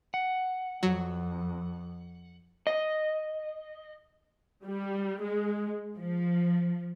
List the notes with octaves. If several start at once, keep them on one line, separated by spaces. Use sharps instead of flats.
F#5
F2 F#3
D#5
G3
G#3
F3